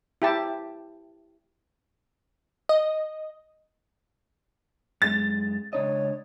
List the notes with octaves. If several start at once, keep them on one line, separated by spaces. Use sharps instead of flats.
E4 G4 A5
D#5
F#2 G#3 A6
C#2 D4 C#5 D#5